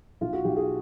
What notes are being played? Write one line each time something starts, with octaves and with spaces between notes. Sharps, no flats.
B1 F4
F#4
B1 G4
G#4